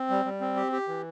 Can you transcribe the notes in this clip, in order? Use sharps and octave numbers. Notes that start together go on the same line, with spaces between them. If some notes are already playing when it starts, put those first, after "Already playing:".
Already playing: C4
G3
G3
C4
G4
G4
E3